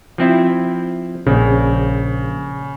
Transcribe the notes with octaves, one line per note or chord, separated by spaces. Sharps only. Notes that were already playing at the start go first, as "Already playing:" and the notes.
F3 C4 E4
A#1 C#3